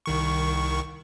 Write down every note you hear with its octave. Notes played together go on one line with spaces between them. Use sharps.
C2 D#3 C#6